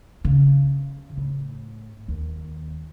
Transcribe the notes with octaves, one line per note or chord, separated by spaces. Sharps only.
C#3
A2
D#2